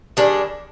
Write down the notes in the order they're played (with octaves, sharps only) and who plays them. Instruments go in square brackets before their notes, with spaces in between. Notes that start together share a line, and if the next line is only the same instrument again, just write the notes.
[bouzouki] D#3 G3 D4 G#4